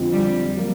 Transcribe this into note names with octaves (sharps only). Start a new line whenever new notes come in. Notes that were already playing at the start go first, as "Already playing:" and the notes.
Already playing: F2 D3 F3 G#3 C4
G3
F#3 A#3